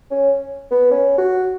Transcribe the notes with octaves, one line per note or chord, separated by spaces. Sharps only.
C#4
B3
C#4
F#4